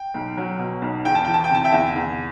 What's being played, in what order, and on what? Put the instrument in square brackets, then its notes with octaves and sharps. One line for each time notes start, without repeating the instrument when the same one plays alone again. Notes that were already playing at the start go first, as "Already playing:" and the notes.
Already playing: [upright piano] G5
B1
F#3
B2
B1
E2 G5
A5
E3 G5
A5
G5
C3 A5
E5 G5
E2
E2